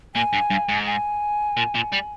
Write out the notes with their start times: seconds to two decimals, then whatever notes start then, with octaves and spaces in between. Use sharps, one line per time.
0.15 A#2 G#5
0.33 G2
0.50 G2
0.69 G#2
0.86 G#5
1.57 A#2
1.75 A#2
1.92 G3